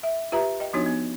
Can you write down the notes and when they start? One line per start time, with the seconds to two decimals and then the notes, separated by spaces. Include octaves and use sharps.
0.03 E5
0.32 F4 G4 B4 E5 A#5
0.60 D#5 G5
0.73 F3 B3 D4 D#4 F#4 C#5
0.86 B3